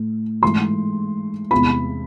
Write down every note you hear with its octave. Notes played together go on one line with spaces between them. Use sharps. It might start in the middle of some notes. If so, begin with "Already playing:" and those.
Already playing: A2
G#2 E3 A3 C6
E2 C3 G#3 B3 B5